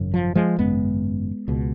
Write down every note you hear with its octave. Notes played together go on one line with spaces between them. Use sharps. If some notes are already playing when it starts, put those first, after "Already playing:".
Already playing: G#1 F#2 C#3
F3
F3 G#3
G#1 F#2 C#3 G#3 B3
C#2 B2